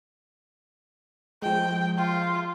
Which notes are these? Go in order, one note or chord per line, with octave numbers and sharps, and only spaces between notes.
F3 G#3 G5
F4